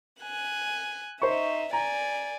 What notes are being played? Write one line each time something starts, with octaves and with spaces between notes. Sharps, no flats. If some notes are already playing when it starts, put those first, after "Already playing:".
G#5 F#6
D#4 C5 E5 C#6
D5 G#5 A#5